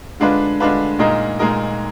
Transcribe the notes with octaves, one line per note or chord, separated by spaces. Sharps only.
D3 G#3 D4 F4 B4
D3 G#3 D4 F4 B4
A#2 G#3 D#4 A#4 D#5
A#2 G#3 D#4 A#4 D#5